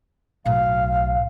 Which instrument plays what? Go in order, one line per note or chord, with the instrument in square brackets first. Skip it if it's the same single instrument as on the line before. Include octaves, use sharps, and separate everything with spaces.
[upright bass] B1 A2 [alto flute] F5